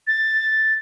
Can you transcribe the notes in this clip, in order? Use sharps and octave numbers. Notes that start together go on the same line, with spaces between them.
A6